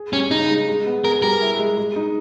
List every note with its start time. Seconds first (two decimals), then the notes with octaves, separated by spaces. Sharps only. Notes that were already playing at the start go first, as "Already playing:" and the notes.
Already playing: G#4
0.13 G3 C#4
0.31 C#3 D#4
0.50 G#3
0.68 G#3
0.86 B3
1.04 G#4 A#4
1.22 G3 A#4
1.41 E4
1.59 G#3
1.77 G#3
1.96 D#4